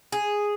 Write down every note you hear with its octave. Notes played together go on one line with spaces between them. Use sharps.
G#4